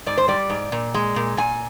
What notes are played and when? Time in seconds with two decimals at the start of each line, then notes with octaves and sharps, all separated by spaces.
0.06 G#2 D5
0.17 C5
0.28 G3 D5
0.50 G#2
0.72 A#2
0.94 G#3
1.16 A#2
1.37 A#2 G#5